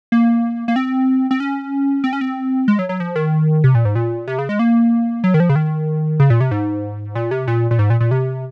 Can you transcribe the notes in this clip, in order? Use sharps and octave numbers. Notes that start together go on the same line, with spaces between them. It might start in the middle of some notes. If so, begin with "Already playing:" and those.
A#3
A#3
C4
C4
C#4
C4
C#4
C4
G#3
F#3
F#3
F3
D#3
C3
A#2
G#2
A#2
C3
C#3
G#3
A#3
F#3
D#3
F3
C#3
D#3
C#3
A#2
C3
G#2
A#2
C3
A#2
A#2
G#2
A#2
A#2
C3